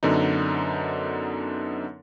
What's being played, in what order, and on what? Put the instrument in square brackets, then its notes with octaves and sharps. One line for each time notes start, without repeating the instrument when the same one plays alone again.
[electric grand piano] F#2 D3 B3 D#4